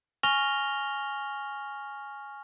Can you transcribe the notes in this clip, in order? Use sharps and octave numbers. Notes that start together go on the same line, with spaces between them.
G#5 C#6 F6 A#6 F7 G7